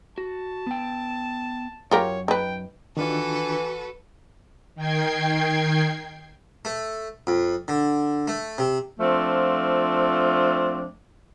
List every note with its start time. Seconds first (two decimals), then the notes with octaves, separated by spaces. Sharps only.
0.18 F#4 A5
0.66 B3 G5
1.91 F#2 F4 G4 A#4 C#5
2.28 D#4 B4 G5
2.97 D#3 E3 D4 F4 F#4 A4 B4
4.75 D#3 G5 G#6 C7
6.65 A3
7.27 F2
7.68 D3
8.28 A3
8.58 C3
8.99 F3 A3 C4 D4 F4